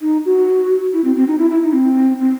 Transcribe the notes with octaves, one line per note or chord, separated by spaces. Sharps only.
D#4
F#4
E4
C4
C4
D#4
E4
E4
D#4
C4
C4